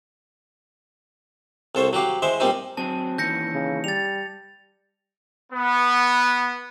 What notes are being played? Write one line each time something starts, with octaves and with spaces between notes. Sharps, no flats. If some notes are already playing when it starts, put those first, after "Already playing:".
C2 A4 C5 C#5
F#3 F#4 G4 F5
G#3 E4 C5 E5
A#2 G3 C4 D#4
F#3 C4 G#4 A5
D#2 E3 C#4 G6 A#6 C#7
C#3
G3 A6 F7
B3